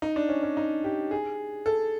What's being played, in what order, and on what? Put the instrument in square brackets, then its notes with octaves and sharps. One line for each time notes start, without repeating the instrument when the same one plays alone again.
[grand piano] D#4
D4
C#4
C#4
D#4
G4
G#4
A4